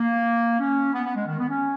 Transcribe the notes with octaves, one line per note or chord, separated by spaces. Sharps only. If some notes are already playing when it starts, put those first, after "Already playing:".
Already playing: A#3
C#4
B3
B3
G#3
D#3
B3
C#4